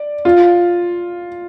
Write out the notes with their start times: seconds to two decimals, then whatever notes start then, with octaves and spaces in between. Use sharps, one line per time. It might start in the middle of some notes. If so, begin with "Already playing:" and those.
Already playing: D5
0.25 F4